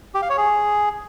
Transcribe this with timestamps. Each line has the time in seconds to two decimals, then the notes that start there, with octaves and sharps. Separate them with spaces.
0.14 G4
0.22 F5
0.30 C#5
0.37 G#4